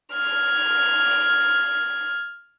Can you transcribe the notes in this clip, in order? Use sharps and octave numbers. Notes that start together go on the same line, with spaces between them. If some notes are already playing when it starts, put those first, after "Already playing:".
F6 G#6